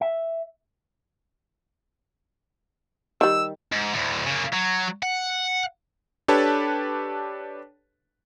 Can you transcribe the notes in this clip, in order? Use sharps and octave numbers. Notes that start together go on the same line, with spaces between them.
E5
D#3 G3 E6
G#2
D2 A2
C#3 A#3
F#3
F#5
D4 G4 A4 B4 C#5 A5